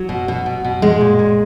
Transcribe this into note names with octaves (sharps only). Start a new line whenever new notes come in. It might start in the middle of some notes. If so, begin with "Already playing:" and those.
Already playing: F#3
B2
B2
B2
B2
A#2 G#3
A#2
A#2